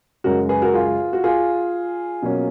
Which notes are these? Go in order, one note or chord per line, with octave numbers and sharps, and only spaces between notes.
F#2 C#3 G#3 F#4 A#4
G#4 B4
F#4 A#4
F4 G#4
F#4
F4 G#4
B2 F#3 A#3 C#4